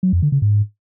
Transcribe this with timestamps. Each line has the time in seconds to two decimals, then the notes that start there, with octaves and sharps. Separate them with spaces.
0.03 F#3
0.13 F2
0.22 D3
0.32 C#3
0.42 G#2